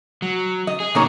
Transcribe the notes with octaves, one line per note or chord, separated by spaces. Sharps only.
F#3
D#5
G#4
B2 D#3 F#3 A#3 D#4 C#5